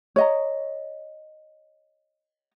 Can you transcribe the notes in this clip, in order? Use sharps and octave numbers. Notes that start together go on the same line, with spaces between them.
C#5 D#5 A#5